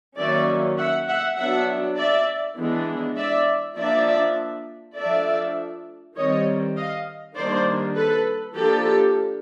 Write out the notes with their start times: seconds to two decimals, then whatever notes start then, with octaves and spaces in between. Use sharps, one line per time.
0.18 D#3 F#3 A#3 C#4 D5 E5
0.77 E5 F#5
1.08 E5 F#5
1.37 F#3 B3 D4 E5 F#5
1.97 D5 E5
2.57 E3 G#3 B3 D4
3.17 D5 E5
3.77 F3 A#3 D4 D5 E5
4.96 F3 A3 D4 D5 E5
6.16 D#3 G3 C4 C#5 D#5
6.76 D#5 F5
7.36 D#3 G3 A#3 D4 C5 D5
7.96 A4 B4
8.56 F3 A#3 D4 G4 A4